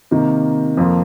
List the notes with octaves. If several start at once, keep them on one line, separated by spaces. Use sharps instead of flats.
C3 D#3 A#3
F2 F3 A#3